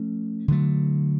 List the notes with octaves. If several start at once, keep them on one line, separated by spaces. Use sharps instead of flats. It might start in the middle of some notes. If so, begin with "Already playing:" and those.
Already playing: F3 A3 C#4
D3 F#3 A3